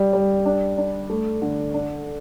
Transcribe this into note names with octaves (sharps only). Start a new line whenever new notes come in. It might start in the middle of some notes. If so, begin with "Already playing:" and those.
Already playing: G3
G3
D4
D4
A3
D3
D4